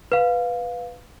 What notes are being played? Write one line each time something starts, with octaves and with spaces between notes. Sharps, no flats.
B4 F5